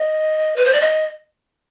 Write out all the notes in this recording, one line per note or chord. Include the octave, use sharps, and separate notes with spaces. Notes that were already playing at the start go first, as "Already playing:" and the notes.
Already playing: D#5
B4
C5
D5
D#5